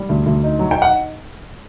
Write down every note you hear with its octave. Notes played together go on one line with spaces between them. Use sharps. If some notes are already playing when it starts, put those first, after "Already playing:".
Already playing: G3
D2
D2
D#4
F#3
G5
D#4
F#5